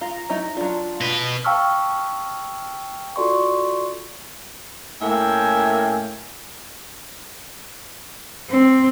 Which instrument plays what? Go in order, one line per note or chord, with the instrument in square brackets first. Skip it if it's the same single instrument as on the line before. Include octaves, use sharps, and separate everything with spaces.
[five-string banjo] F4 [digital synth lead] A#5
[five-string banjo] F#3 D#4 E4
[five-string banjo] F#3 D4 [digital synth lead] F4
[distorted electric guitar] B2 B4
[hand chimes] F5 G5 A5 C#6 E6 F6
F4 F#4 A4 D5 C6 C#6
[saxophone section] A2 A#3 E5 [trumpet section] C#4 G5 G#5
[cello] C4